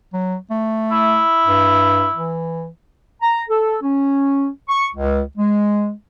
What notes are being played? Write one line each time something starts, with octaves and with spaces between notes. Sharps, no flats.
F#3
A3
E4
G2
E3
A#5
A4
C#4
C#6
C#2
G#3